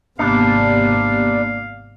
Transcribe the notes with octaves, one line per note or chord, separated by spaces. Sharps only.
G#1 C3 A#3 B3 D4 G4 F5